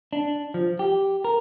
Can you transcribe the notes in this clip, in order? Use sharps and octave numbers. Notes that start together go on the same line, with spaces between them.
D4
F3
G4
A#4